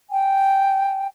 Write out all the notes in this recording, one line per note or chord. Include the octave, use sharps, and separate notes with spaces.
G5 G#5